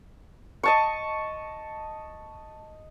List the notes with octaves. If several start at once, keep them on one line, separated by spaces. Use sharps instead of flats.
D#5 A5 C#6